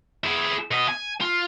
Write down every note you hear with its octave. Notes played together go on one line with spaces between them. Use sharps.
E4 G#4
B2 D#5
G#5
F4